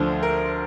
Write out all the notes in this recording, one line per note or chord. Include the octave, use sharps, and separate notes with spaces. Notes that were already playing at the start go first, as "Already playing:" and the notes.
Already playing: D2 D3 F3 C5
A#4